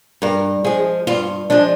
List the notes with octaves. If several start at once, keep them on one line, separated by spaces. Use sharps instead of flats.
G2 A#4
F3 G#3 G#4
G2 F4
F3 G#3 D4